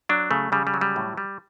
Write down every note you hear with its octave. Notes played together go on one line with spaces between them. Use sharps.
F#3 D4
C#3 A3
C#3 G3
G3
F#3
G3
A2
G3